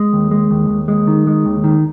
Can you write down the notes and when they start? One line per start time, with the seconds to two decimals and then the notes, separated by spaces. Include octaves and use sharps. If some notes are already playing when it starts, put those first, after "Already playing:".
Already playing: G#3
0.13 D#2
0.31 G#3
0.51 D#2
0.69 D#2
0.88 G#3
1.07 D#3
1.27 G#3
1.45 D#2
1.64 D#3